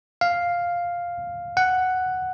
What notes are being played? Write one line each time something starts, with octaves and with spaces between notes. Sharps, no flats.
F5
F#5